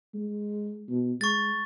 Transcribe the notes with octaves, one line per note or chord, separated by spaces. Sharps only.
G#3
B2
G#3 C#6 A6